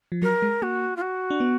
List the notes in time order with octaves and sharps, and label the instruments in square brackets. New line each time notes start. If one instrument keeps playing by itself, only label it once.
[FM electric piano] F3
[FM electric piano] F#3 [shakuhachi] A#4
[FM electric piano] G#3
[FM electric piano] A#3 [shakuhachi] F#4
[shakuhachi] F4
F#4
[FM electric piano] D4
B3